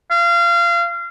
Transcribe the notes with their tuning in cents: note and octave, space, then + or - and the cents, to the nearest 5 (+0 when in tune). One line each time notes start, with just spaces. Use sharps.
F5 -25